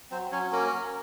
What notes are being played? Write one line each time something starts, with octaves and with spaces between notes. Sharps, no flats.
F#3 C4 C5
F#3 C#4 C#5
A#3 C#4 A#4
F#3